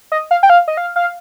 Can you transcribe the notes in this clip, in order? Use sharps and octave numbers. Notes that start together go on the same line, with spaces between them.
D#5
F5
G5
F5
D#5
F5
F5